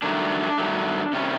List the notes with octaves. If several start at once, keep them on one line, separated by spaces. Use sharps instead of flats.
G2 D#3 F#3 A3 D4
G2 D#3 F#3 A3
C3 D#3 G3 C#4